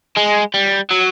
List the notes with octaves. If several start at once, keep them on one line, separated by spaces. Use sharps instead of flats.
G#3
G3
F#3